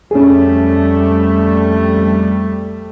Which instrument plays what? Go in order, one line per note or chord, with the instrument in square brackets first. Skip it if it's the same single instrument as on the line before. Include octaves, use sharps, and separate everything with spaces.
[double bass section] F2 G3 A3 [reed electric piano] C#4 G#4